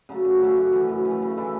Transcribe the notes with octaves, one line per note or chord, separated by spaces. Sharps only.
C#3 F#3 A3
F#2
C#3 F#3 A3
F#2
E3 A3
F#2
E3
A3
C#3
E3 A3 E4